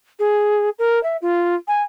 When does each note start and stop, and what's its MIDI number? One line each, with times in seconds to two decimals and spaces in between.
0.19 0.69 68
0.79 1.01 70
1.03 1.17 76
1.22 1.55 65
1.68 1.82 80